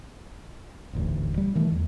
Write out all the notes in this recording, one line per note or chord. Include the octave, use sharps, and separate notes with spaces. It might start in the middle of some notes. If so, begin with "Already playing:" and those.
D#1 A1 D2
G3
D#3 E3 A3
E2